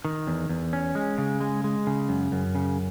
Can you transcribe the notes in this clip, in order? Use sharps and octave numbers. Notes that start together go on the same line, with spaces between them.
D#3
E2
E2
C#4
G#3
C#3
G#3
G#3
C#3
F#2
F#2
C#3